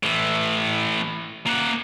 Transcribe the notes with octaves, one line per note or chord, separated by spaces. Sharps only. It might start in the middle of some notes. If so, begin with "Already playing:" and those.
A2 E3
A#3 F#5